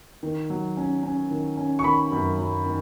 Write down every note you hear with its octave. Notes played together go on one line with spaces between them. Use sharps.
D#3
F#3
C#4
C#4
D#3
C#4
C#6
D#3 B5
F#2
F#3
D#3